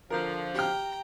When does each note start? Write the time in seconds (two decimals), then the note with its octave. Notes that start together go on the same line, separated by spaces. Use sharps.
0.10 D3 F3 A#4
0.54 G4 G5 A#5 F6